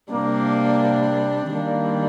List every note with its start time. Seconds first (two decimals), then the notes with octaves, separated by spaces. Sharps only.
0.12 C3 G3 A#3 D4
1.51 D#3 G3 A#3 D4